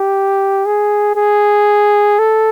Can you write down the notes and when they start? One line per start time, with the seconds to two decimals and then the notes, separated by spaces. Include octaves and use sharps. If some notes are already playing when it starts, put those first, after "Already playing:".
Already playing: G4
0.66 G#4
1.16 G#4
2.19 A4